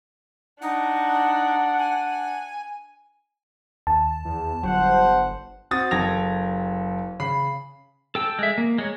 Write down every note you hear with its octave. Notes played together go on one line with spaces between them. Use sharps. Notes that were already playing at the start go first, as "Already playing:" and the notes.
D4 D#4 F#5
G#5
D#2 A5
E2
G1 F#3 C5 F#5
C4 F#4 D#6 A6
F#1 A4 G5 G#6 A#6 F7
C#3 B5 C7
A4 G5 E6
G#3 E5
A#3
G#3 C#5